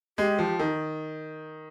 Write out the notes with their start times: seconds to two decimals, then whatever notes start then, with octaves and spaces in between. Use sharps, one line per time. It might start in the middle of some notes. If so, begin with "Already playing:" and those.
0.18 G#3 G4
0.39 F3
0.59 D#3